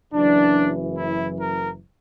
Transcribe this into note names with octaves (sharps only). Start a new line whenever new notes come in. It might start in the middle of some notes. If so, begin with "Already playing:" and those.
F#1 F#2 E3 D4
E4
A#4